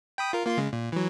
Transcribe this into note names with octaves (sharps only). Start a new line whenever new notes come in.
G5 B5 D#6
F4 A#4
A#3 F4 C6
C#3 G#3
A#2
E3 F#3